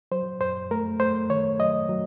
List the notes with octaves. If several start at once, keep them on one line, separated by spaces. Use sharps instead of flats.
F#3 C5
F#2 C5
A3 A#4
A3 C5
D#3 C#5
F#3 D#5
F#3